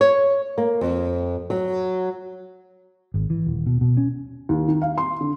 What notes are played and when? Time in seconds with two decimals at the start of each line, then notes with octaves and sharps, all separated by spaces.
0.01 C#5
0.58 A#3
0.81 F2
1.50 F#3
3.14 G#1
3.30 E3
3.46 D#1
3.66 B2
3.81 B2
3.97 C#4
4.49 D#2
4.68 D#3
4.82 F5
4.98 C6
5.21 D3